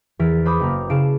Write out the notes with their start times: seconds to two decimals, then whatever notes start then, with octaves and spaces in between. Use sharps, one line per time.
0.19 E2 E3 A#4 A6 B6
0.45 B4 C5 B5 D6 D#6
0.60 F#1 A#3 A#5
0.90 C#3 E4 F5 A5 D7